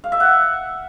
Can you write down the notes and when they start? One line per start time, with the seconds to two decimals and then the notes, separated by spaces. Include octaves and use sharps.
0.04 F5
0.12 E5
0.20 F#5